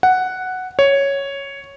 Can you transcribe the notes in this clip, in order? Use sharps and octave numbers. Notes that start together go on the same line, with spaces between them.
F#5
C#5